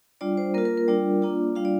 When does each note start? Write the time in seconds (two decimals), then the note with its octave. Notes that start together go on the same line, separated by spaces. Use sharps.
0.21 G3 D4 F4 D5
0.37 C5
0.54 A#3 A#4
0.58 F4
0.65 A#4
0.77 A#4
0.88 G3 D4 F4 D5
1.22 A#3 D4 F4
1.55 G3 D4 F4 F5
1.65 D5